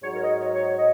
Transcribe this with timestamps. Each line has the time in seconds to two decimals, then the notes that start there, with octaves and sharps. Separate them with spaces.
0.02 G#2 F#3 C#5
0.14 A#4
0.23 D#5
0.27 C#5
0.40 C#5
0.53 C#5
0.78 D#5